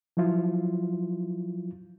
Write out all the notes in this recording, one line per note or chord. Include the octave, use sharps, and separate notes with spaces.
F3 F#3 E4 F4